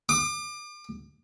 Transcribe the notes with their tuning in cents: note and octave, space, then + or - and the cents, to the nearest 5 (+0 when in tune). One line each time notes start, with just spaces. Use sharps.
D6 +35